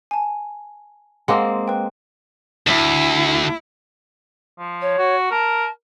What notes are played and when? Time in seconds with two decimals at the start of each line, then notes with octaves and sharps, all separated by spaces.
0.11 G#5 A5
1.28 G#3 A#3 C4 F#5 C6 D6
1.68 B4 G5
2.67 D2 E4
4.59 F3
4.81 C#5
4.98 F#4
5.31 A#4 A5